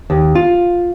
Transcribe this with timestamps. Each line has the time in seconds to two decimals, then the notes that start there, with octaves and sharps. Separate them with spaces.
0.10 D#2
0.35 F4